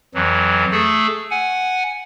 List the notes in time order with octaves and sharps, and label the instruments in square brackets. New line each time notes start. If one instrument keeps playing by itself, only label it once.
[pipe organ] F2 E3 F#3
A3 G#4 A4
F#5 G#5